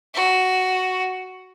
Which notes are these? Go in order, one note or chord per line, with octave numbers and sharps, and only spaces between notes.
F#4